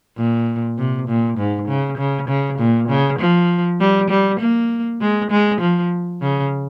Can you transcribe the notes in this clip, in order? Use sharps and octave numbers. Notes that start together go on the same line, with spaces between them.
A#2
C3
A#2
G#2
C#3
C#3
C#3
A#2
C#3
F3
G3
G3
A#3
G#3
G#3
F3
C#3